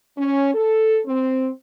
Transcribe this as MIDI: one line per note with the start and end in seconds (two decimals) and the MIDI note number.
0.18 0.53 61
0.54 1.00 69
1.06 1.50 60